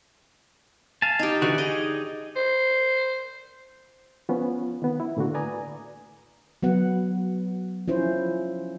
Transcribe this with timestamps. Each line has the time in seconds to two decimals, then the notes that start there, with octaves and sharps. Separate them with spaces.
1.02 F5 G#5 A5
1.19 D#4 G4
1.42 D3 E3 F#4 D5
1.58 D#4 G#4 D#5
2.36 C5
4.29 F3 B3 C#4
4.82 D#3 B3
5.00 E4
5.17 A2 D3 A#3 F#4
5.34 B4 D5 G#5 A#5 D#6
6.63 F#3 B3 F#5
7.88 F3 C#4 E4 C5